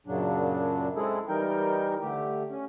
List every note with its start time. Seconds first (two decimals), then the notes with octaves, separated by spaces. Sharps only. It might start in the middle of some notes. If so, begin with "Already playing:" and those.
0.07 F#2 A#2 C#3 F#3 D4
0.96 G#3 C4 E4 G#4 A4
1.28 E3 G3 D#4 A#4 G5
2.02 D3 A3 G4
2.50 C#4